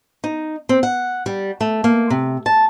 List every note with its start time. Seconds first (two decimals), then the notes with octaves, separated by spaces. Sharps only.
0.24 D#4
0.69 C4
0.83 F#5
1.26 G3
1.61 A3
1.84 A#3
2.10 C3
2.46 A5